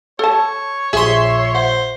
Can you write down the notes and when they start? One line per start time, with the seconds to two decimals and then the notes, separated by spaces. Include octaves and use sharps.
0.19 A4 C#5 A5
0.93 A#1 G#4 E5 C6
1.55 C5 F#5